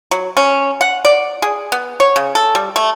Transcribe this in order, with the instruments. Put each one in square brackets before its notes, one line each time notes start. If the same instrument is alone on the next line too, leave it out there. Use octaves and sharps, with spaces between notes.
[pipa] F#3
C#4
F#5
D5
G#4
B3
C#5
C#3
A4
G3
A3